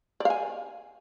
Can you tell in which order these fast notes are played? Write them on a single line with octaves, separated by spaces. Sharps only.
D5 F5 G#5